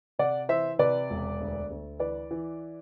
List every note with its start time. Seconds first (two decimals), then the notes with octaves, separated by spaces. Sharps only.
0.19 C3 D5 F#5
0.49 E3 C5 E5
0.79 C3 B4 D5
1.10 E1
1.40 D2
1.70 D2
1.99 E3 B4 D5
2.31 E3